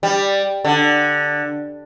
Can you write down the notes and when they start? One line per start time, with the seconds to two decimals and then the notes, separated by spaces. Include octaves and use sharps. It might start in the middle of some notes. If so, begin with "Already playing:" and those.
0.03 G3
0.64 D3